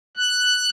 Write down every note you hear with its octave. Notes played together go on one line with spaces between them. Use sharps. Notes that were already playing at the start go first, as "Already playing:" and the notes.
F#6